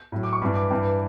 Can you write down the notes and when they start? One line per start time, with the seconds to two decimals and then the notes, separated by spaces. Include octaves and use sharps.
0.12 A2 F#3
0.23 D6
0.33 C#6
0.42 G2 E3 B5
0.55 D6
0.70 G2 E3 G5